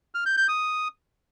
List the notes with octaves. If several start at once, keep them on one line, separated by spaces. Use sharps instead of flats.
F6
G6
G6
D#6